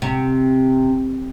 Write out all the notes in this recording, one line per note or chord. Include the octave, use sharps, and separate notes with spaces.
C3